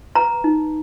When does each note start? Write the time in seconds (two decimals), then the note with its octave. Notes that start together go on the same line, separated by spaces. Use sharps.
0.15 B4 A#5
0.44 D#4